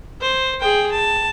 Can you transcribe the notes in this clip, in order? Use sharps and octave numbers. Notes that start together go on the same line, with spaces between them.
C5
G#4 G5
A5